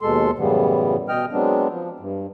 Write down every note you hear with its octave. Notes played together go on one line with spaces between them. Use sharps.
D#2 B2 G#3 A4 C6
F#2 A2 C#3 E3 G3 B3
B2 D#5 G5 F6
F#3 G#3 B3 C4 D4
F3
G2